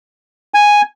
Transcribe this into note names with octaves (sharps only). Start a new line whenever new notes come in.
G#5